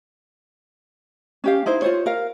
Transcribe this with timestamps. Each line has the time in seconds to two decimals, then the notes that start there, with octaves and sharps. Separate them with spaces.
1.44 C#4 G4 F5
1.66 D#4 E4 C5
1.82 F4 C5 C#5
2.06 A#4 F5